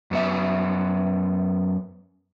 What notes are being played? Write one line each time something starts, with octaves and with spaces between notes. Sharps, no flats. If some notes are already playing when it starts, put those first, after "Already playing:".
F#2 B3 E5